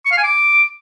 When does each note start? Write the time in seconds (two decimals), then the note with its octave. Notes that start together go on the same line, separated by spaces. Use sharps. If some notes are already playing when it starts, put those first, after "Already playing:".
0.06 C#6
0.12 F5
0.18 G#5
0.24 D6